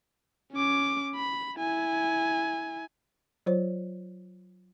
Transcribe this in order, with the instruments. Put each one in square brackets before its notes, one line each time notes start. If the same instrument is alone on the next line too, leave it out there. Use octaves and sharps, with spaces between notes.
[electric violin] C#4 D6
B5
E4 G#5
[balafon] F#3 F4 C5 C#5